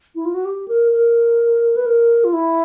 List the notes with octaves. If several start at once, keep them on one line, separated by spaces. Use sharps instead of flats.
E4
F4
F#4
G4
A#4
A#4
B4
A#4
F4
E4